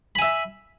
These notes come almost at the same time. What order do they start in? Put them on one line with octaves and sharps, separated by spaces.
B5 G#5 E5